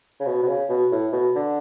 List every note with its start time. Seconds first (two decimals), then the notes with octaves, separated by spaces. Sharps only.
0.20 C#3
0.26 B2
0.43 B2
0.47 C#3
0.69 B2
0.92 A2
1.13 B2
1.35 D3